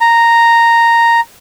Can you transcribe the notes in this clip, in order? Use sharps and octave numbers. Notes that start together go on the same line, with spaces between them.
A#5